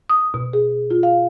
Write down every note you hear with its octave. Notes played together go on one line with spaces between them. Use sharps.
D#6
B2
G#4
F4
F5